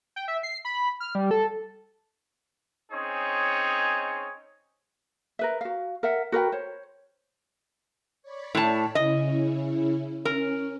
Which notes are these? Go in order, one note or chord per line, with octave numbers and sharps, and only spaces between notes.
G5
E5
C7
B5
F6
G3
A4
C4 C#4 D#4 G#4 C#5
A#4 B4 E5
F#4 F5
A#4 E5 F#5
F#4 A#4 B4 G5
C5 C#5
C#5 D5 B5
A2 A5
C#3 C#4 E4 D#5
C#4 A#4